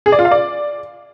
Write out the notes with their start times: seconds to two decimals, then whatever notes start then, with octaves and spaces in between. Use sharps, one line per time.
0.06 G#4
0.12 D5
0.19 F4
0.25 F5
0.31 D5